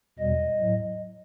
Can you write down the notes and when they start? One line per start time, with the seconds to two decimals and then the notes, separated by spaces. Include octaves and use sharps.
0.19 E2 B2 G3 D#5
0.59 A2 F#3